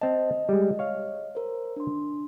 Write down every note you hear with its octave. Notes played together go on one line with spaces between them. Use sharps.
C4 D#5 A5
G3 G#3
C#5 F5
A#4 C5
D4 C6